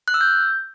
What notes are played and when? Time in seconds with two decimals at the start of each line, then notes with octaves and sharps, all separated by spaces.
0.08 F#6
0.14 E6
0.21 G6